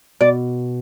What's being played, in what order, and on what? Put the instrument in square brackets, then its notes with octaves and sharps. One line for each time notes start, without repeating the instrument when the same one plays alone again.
[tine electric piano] B2 [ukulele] D5